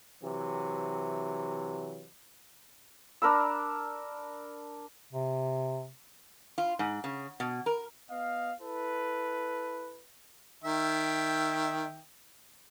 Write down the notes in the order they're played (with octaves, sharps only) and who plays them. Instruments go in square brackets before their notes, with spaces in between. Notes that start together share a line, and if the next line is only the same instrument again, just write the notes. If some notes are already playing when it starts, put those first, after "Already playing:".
[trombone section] C3 E3 F#3
[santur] D4 A#4 B5 E6
[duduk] C3
[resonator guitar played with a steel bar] F4
G#2
C#3
B2
A#4
[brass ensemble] B3 D#5 F5
E4 A4 B4
[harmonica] D#3 E5 G5